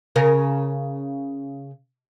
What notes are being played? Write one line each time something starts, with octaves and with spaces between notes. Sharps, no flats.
C#3 A#4